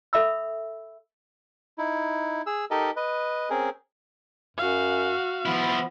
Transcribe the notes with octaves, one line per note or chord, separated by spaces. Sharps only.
A4 E5 B5 E6
D#4 E4
G#4 E6
D#4 G4 A4 A#4 D#5
B4 D#5
C4 C#4 G#4 A#4
F#2 F#4 F5
F3 B3 E4